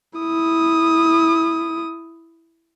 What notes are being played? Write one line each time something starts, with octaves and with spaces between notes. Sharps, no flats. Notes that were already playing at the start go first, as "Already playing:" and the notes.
E4 D#6